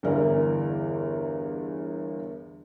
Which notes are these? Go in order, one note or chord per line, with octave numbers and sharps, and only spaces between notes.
G1 E2 E3 A#4 D5